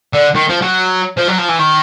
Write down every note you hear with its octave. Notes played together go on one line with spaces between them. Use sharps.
D3
D#3
F3
F#3
F3
F#3
F3
E3
D#3